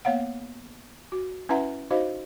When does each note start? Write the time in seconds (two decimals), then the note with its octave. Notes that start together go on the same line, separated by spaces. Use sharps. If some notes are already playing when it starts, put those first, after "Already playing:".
0.05 A#3 B3 C#5 F5 F#5
1.12 F#4
1.49 C#4 E4 B4 E5 F#5 A#5
1.91 D#4 F#4 C5 D#5 F5